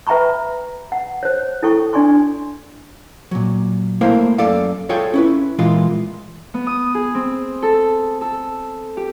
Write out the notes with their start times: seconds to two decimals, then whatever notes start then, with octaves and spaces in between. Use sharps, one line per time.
0.07 B4 E5 G5 A#5 B5 C#6
0.92 F#5
1.23 C5 C#5
1.63 E4 A4 G5 C#6
1.93 D4 D5 G#5 C6 C#6
3.31 A#2 F#3
4.01 A3 A#3 E4 A#4 C5 F5
4.38 F#2 A4 D5 F5
4.89 F4 G#4 A4 C#5 F5 G5
5.14 C#4 E4 B4
5.59 A#2 E3 G#3 A#3 F4
6.54 B3
6.67 D#6
6.95 G#4
7.15 C4
7.62 A4
8.21 A4
8.97 G4